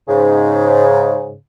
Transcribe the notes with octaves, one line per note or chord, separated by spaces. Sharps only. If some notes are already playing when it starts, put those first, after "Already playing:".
G#2 C#3